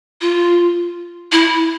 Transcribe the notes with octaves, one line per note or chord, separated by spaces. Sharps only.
F4
E4